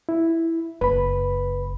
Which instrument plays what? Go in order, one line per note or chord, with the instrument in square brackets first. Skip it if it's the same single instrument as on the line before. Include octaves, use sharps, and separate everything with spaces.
[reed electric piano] E4
[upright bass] F#1 [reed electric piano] B4 B5